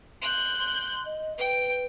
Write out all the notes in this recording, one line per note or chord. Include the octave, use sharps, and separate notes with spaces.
C6 F#6 G6
C6
D#5
B4 G5